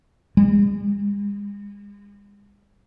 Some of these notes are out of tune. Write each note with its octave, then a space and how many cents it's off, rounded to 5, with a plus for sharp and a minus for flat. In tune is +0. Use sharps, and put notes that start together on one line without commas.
G#3 -40